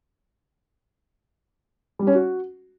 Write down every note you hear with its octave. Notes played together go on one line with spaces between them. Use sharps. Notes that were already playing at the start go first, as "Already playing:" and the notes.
G3
C#4
F#4